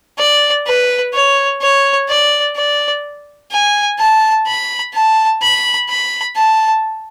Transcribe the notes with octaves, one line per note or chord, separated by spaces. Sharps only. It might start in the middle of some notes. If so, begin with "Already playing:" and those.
D5
B4
C#5
C#5
D5
D5
G#5
A5
B5
A5
B5
B5
A5